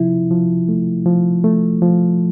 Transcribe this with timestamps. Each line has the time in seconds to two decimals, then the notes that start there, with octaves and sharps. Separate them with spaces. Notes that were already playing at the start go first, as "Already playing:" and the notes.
Already playing: C3 F3 E4
0.31 F3
0.69 A3
1.06 F3
1.44 A3
1.82 F3